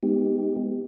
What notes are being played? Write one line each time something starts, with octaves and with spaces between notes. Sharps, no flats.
G#3 B3 D#4 G4